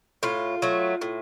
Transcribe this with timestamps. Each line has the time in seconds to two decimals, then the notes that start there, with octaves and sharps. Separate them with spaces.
0.23 A2 F4
0.62 F#3 A3
1.01 A2